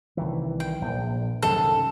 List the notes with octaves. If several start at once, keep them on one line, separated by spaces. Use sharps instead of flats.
C2 D#3 E3
G5
A#1
C2 F#2 D#3 A4